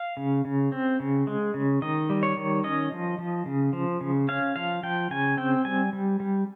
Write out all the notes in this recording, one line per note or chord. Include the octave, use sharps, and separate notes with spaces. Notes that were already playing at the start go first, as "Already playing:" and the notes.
Already playing: F5
C#3
C#3
C4
C#3
G#3
C#3
D#3 D#5
G3
C#5
D#3
C#4 D#5
F3
F3
C#3
F3
C#3
C#4 F5
F3 F5
F3 G5
C#3 G#5
C4 G5
G3 G#5
G3
G3